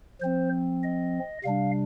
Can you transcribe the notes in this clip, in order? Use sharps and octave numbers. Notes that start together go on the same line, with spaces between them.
F3 C4 C5
D#5
C3 G3 D4 F5